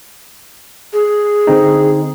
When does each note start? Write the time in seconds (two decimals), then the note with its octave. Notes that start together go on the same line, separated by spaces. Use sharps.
0.93 G#4
1.47 D3 C4 D#4